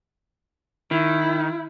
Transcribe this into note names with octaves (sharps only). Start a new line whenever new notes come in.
D#3 E4